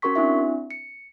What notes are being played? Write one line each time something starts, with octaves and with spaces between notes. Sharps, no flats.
C#4 F#4 A#4 C6 C#6 B6
C4 D4 E4 E5
C#7